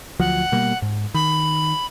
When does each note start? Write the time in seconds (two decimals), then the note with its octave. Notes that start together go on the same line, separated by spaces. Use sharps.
0.20 D2 F3 F#3 F#5
0.52 B2 G3 A#3
0.82 G#2
1.14 D#3 B5